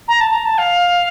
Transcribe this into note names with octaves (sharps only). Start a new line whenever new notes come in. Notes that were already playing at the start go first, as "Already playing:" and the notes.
A#5
A5
A#5
A5
F5